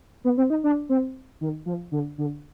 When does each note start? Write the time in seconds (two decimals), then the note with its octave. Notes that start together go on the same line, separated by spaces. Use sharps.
0.24 B3
0.37 C4
0.50 D#4
0.64 D4
0.89 C4
1.41 D#3
1.66 F3
1.92 D3
2.18 D3